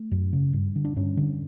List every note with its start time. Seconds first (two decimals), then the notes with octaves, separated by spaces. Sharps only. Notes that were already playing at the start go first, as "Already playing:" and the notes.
Already playing: A3
0.11 F#2
0.33 C#3
0.53 G2
0.76 D3
0.85 D4
0.96 G2 C#4
1.17 D3